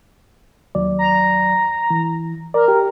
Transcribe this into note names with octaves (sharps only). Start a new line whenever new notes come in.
D#2 F#3 D5
A#5
E3
A#4 D5
G4